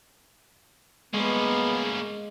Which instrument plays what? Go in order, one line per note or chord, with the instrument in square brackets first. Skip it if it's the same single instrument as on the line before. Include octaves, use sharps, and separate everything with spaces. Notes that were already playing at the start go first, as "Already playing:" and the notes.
[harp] G#3 [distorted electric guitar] A#3 C#4 [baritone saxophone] B3